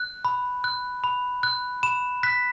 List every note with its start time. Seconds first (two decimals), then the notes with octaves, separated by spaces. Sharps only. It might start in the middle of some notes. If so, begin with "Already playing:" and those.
Already playing: F#6
0.25 B5
0.64 F#6
1.04 B5
1.43 F#6
1.83 B5 E7
2.23 F#6 B6